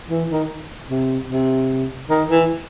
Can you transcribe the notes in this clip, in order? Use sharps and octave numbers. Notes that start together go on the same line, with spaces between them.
E3
D#3
C3
C3
D#3
E3